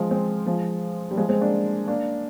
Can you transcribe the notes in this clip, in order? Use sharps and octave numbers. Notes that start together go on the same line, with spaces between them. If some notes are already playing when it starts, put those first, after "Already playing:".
Already playing: F3 G#3
G#3 C4
F3 G#3
G3
F3 G#3
G#3 C4
A#3 D4
A#3 D4